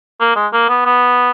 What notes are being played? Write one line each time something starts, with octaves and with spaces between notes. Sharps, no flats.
A#3
G#3
A#3
B3
B3